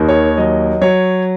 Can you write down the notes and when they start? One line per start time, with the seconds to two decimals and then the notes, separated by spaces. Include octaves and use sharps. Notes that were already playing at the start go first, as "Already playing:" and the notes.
Already playing: D#2 D#3
0.09 C#5
0.37 F#3 D#5
0.81 F#3 C#5